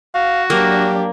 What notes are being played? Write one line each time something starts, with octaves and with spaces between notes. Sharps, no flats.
F#4 F5
F#3 A#3 D4 G4